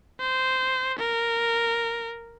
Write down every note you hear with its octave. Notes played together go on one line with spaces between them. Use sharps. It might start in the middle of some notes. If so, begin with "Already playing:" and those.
C5
A#4